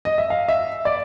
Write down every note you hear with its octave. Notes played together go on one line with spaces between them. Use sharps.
D#5
E5
F5
E5
D5